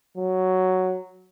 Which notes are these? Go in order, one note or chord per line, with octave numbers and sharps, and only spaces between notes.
F#3